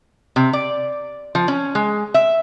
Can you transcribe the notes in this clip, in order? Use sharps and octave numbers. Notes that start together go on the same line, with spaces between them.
C3
D5
F3
C#4
G#3
E5